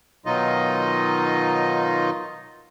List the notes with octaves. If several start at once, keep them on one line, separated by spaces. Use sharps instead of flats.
B2 D#3 F#3 D#4 F4 D#5